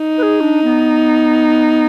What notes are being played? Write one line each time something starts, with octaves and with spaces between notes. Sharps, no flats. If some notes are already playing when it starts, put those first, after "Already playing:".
Already playing: D#4
B4
G#4
D4
B3